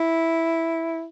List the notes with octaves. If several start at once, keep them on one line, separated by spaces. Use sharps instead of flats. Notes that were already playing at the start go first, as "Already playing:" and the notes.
Already playing: E4